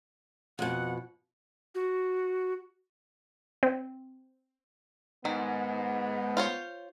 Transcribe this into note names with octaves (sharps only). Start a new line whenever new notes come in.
F2 B2 F#5
F#4
C4
G#2 D#3 B3
F4 C5 C#5